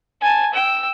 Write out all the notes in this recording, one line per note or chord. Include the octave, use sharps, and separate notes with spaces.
G#5 A5
G5 E6